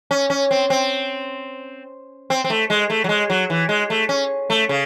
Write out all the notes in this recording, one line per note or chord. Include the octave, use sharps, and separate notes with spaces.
C#4
C#4
C4
C4
C4
C4
A3
G#3
A3
F#3
G#3
F#3
E3
G#3
A3
C#4
A3
C#3